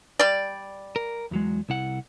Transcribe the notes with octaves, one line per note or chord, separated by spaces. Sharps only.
G3 D5
A#4
E2 F#3 G#3
C2 E4 F#5